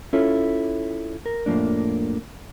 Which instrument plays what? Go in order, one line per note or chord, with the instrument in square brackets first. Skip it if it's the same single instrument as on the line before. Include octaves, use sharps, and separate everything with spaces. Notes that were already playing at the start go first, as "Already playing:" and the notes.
[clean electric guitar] C#4 E4 F4 A4 C#5
A#4
F2 A2 D3 F3 A#3 D4